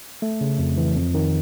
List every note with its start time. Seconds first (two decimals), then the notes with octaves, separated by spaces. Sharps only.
0.22 A3
0.41 C#3
0.58 F2
0.77 E3
0.96 F2
1.14 D#3